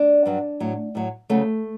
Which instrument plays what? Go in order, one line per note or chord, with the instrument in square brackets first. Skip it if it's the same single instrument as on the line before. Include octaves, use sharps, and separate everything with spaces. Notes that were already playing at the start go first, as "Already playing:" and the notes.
Already playing: [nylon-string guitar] D4
G2 F#3
A2 F#3
A2 F#3
D2 C#3 F#3 A3